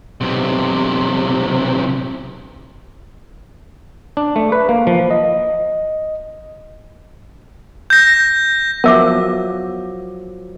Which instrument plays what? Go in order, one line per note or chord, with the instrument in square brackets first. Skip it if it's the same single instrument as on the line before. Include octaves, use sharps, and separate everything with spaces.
[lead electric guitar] B1 C3
[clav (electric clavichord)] D4
A3
B4
A#3
F3
[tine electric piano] D#5
[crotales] G6 A#6
[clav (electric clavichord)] F3 F#3 [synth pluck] B3 E5 [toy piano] A#4 A5 D6